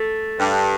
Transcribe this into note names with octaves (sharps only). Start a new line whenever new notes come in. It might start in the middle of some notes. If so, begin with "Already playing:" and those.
Already playing: A3
G2